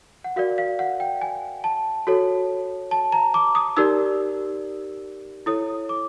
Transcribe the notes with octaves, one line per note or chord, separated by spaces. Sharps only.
F#5
F#4 A#4 D5 F5
F5
F#5
G5
G#5
A5
F#4 A4 C#5
A5
A#5
D6
D#6
D#4 G4 A#4 D5 E6
E4 A4 C#5 D#6
D6